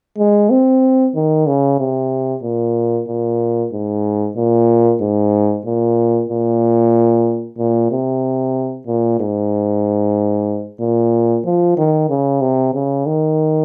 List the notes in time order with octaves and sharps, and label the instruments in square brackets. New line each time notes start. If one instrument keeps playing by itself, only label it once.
[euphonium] G#3
C4
D#3
C#3
C3
A#2
A#2
G#2
A#2
G#2
A#2
A#2
A#2
C3
A#2
G#2
A#2
F3
D#3
C#3
C3
C#3
D#3